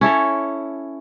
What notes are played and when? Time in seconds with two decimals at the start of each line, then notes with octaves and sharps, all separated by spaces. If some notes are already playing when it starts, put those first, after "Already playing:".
0.01 C#4 E4 A4 C#5